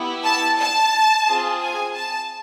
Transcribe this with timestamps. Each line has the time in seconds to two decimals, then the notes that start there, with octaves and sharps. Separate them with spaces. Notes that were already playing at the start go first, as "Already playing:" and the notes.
Already playing: B3 E4 G4
0.23 A5
0.58 A5
1.27 C4 F4 G#4
1.61 G#5
1.95 A5